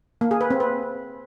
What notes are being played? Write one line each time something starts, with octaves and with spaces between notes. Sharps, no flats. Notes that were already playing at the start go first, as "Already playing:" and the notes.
A#3
G#4
B4
C4
B4